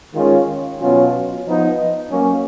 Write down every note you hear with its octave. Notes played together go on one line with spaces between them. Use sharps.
D#3 G#3 C#4 F4
B2 F#3 C#4 F4
F3 B3 D#4
F#3 A#3 C#4